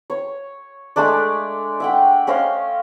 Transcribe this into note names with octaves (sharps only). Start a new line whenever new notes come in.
C#5
G#3 A3 D4 D5
E5 F#5 G5
C#4 C5 D#5 F5